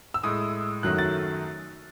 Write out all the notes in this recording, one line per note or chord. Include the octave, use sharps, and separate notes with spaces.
E6
A2 G#3 D#6
F#2 D#3 F#3 A3 F#6
A6